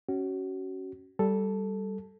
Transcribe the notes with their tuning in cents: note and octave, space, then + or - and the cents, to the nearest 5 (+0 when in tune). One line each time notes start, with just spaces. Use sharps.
C#4 +0 F#4 +25
G3 -10 A4 +0